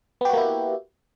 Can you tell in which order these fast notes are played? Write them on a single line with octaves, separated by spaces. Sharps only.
B3 G4 F#4 A#3 E4